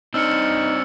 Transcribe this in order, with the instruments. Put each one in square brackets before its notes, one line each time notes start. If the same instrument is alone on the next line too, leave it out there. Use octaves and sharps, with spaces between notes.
[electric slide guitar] C4 D4 [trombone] D#4 [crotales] E6 F6 C#7